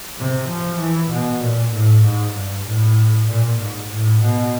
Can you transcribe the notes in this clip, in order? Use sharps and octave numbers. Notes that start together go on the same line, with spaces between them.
C3
F3
E3
B2
A#2
A2
G#2
G2
A2
A#2
G#2
A2
B2